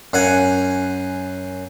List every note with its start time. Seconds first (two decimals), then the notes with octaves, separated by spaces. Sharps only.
0.13 F#2 F5 F#5 G#5